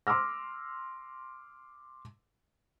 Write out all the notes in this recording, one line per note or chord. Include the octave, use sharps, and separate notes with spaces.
C6 D6 E6 F6 A#6